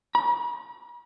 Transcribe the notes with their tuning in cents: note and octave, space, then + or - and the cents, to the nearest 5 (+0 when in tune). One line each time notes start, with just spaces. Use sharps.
B5 -45